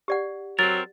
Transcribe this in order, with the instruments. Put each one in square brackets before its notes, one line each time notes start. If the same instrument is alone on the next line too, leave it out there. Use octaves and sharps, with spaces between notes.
[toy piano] G4 D5 F#5
[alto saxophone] F#3 [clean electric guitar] C4 A#4 [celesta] A6